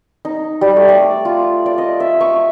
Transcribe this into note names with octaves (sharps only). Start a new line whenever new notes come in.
D#4
G3
A3
D5
F4
D5
D#5
E5
C#6